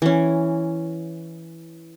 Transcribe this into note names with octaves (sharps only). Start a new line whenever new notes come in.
E3 C#4